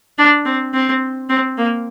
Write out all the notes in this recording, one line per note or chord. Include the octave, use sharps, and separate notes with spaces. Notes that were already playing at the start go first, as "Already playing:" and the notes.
D4
C4
C4
C4
A#3